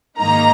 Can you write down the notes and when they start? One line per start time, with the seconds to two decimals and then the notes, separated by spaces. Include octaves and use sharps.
0.20 G#2 D#3 A#3 D#4 A#5